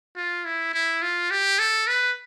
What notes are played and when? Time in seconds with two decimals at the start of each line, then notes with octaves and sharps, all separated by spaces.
0.16 F4
0.45 E4
0.73 E4
1.02 F4
1.31 G4
1.59 A4
1.87 B4